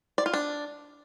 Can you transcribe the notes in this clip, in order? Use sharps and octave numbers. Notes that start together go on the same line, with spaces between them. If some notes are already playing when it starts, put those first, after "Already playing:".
D5
F4
D4